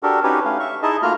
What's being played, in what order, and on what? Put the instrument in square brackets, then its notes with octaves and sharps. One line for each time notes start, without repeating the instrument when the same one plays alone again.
[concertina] D4 F#4 G4 A4 A#4
C#4 D#4 F#4 G4 B4 C#5
A3 C#4 F5
E5 C#6
D#4 E4 G#4 D#5 E5 A5
A3 A#3 F4 F#4 A#5 F6